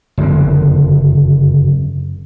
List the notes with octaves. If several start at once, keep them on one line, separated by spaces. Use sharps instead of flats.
F#1 F2 D3